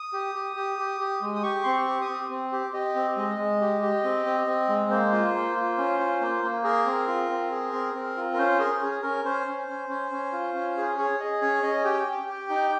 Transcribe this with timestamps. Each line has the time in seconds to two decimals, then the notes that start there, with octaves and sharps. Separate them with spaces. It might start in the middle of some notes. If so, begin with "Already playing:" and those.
Already playing: D#6
0.13 G4
0.35 G4
0.56 G4
0.79 G4
1.00 G4
1.21 G#3
1.36 D#6
1.43 G4 C#6
1.64 C4 C6
1.72 C#6
1.87 G4
2.02 D#6
2.09 C4
2.30 C4
2.52 G4
2.74 G4 D#5
2.96 C4
3.16 G#3 D#5
3.38 G#3
3.61 G4
3.82 G4
4.04 C4
4.26 C4
4.47 C4
4.69 G#3
4.90 A#3 C5
5.12 F4
5.34 A#3
5.56 F4
5.78 C#4
6.00 F4
6.21 A#3
6.43 A#3
6.64 G#4 A#4
6.86 C4
7.07 F4
7.29 C4
7.51 G#4
7.73 C4
7.94 C4
8.17 F4
8.33 A#4
8.38 C#4 C5
8.59 G#4 A#4
8.73 A#4
8.81 C#4 G#4
9.02 C#4 A#4
9.25 C#4 C5
9.47 C#4
9.68 C#4
9.89 C#4
10.12 C#4
10.32 F4
10.54 C#4
10.77 G#4
10.98 G#4 C#5
11.19 G#4 D#5
11.42 C#4 C#5
11.63 C#4 D#5
11.85 G4 G5
12.07 G4
12.28 G4
12.50 D#4